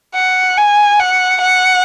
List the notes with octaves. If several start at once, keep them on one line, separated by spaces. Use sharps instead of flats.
F#5
G#5
F#5
F#5